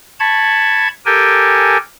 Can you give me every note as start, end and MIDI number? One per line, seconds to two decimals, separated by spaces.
0.20 0.88 81
0.20 0.88 83
0.20 0.88 85
0.20 0.88 92
1.06 1.77 67
1.06 1.77 69
1.06 1.77 70
1.06 1.77 79
1.06 1.77 80